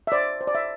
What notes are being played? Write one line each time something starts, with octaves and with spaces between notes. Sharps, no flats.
E5
C5 D5
C5
D5
E5